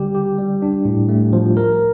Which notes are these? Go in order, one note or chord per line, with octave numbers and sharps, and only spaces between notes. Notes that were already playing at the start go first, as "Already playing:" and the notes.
Already playing: D3 G3 G4
G4
G3
D4
A2
A3
F3
A#4